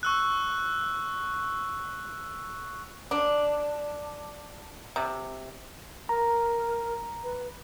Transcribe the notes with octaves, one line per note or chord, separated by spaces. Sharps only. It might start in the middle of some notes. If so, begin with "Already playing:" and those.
C#6 E6 F#6
D4
C3
A#4 A#5
B4